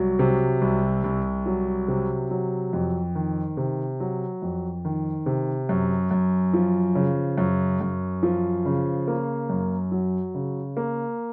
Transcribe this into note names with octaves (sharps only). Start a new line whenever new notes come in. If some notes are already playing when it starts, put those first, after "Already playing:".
Already playing: C2 F#3
C3
C2
C2
F#3
C3
F#3
F2
D#3
C3
F#3
F2
D#3
C3
F#2
F#2
F3
C#3
F#2
F#2
F3
C#3
A#3
F#2
F#3
C#3
A#3